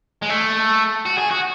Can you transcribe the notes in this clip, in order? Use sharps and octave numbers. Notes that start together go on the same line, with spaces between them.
G#3
A3
F#4
G#4
F#4